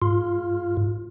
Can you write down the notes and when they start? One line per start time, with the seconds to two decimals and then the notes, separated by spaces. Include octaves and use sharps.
0.02 G#2 F4